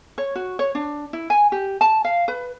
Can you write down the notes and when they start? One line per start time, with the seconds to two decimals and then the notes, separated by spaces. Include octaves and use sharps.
0.18 C#5
0.36 F#4
0.59 C#5
0.75 D4
1.13 E4
1.30 G#5
1.52 G4
1.81 A5
2.05 F5
2.28 B4